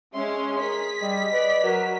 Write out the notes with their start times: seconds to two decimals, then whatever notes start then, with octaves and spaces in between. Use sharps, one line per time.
0.14 G#3 C#4 E5 C6
0.61 G#4 A#4 B6
1.02 G3 D#5
1.33 B4 D5
1.64 F#3 F#4 A#4